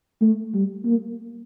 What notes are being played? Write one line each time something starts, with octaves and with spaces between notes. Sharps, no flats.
A3
G3
A#3